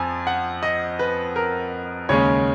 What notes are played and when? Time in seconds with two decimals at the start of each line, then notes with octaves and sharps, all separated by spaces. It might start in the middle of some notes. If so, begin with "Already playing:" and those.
Already playing: F2 F3 G#5
0.27 F#5
0.63 D#5
0.99 B4
1.36 A#4
2.09 D#2 C#3 G#3 C#4 C#5